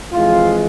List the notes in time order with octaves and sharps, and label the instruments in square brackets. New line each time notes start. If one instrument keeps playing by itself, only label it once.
[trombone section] F2 C3 E3 G#3 F4